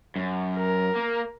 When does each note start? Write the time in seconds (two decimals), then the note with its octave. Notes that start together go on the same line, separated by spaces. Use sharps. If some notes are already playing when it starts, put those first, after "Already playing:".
0.16 F#2
0.56 A#4
0.95 A#3